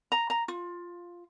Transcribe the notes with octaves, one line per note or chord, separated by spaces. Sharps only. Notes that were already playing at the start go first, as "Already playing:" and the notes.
A#5
A#5
F4